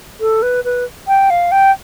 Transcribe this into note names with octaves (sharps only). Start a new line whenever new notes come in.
A4
B4
B4
G5
F5
G5